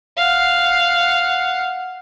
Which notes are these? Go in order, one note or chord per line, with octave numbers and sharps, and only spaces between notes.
F5 F#5